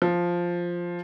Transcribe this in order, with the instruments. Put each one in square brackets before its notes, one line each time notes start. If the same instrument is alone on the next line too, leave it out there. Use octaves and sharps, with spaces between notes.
[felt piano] F3